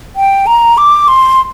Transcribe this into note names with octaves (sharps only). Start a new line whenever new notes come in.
G5
A#5
D6
C6